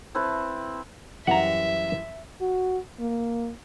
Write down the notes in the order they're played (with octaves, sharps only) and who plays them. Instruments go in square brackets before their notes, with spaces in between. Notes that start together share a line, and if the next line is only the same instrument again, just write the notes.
[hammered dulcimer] C4 E4 A4 B4
[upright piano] F#2 E3 G3 [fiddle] E5 [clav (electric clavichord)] F#5 A#5
[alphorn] F#4
A#3